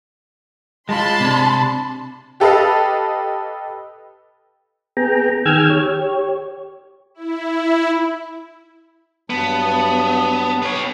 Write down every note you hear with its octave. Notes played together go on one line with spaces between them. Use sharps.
G#3 F4 A5 B5 C6
C3 D4
G4 A4 B4 D#5 F5
B3 G#4 G5 A#5
D#3 G#4 G5 E6 F6 G#6
G4 C#5
E4
G2 F#3 B3 A5
B3 C#5